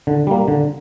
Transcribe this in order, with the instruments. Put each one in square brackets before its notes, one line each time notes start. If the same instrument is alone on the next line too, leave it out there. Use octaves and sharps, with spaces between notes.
[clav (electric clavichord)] D3
G3 A#3
D3